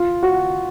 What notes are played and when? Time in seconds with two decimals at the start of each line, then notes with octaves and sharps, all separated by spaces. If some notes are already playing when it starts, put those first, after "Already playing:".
Already playing: F4
0.23 F#4